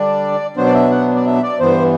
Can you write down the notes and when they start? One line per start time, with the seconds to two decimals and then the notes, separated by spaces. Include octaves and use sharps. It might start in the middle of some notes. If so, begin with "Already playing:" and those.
Already playing: D3 G3 D4 D5
0.57 B2 F#3 B3 D4 C5
0.66 D5
0.74 E5
0.91 F#5
1.16 D5
1.26 E5
1.43 D5
1.60 G2 E3 B3 C5